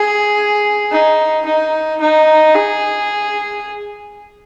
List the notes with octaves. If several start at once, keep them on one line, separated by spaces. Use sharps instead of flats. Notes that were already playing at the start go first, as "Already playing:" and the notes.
Already playing: G#4
D#4
D#4
D#4
G#4